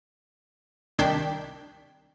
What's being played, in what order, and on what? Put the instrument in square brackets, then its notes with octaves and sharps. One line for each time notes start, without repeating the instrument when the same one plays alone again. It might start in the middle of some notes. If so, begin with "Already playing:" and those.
[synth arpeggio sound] C2 D#3 D4 G5 G6 B6